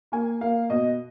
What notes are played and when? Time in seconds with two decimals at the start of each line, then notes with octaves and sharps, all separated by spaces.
0.12 A#3 G#5
0.41 A#3 F5
0.70 B2 D#5